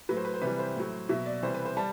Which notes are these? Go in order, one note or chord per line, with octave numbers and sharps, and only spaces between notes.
A2 F#3 B4
C5
B4
C5
C3 E3 G3 B4
C5
A2 F#3
B2 F#3 E5
D5
C3 E3 G3 C5
B4
C5
G3 A5